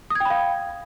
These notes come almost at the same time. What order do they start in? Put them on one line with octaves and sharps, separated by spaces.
D#6 G#6 G5 B5 F5